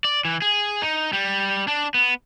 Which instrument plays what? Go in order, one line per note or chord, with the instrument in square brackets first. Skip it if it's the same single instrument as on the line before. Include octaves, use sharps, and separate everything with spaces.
[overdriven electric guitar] D5
E3
G#4
D#4
G3
D4
B3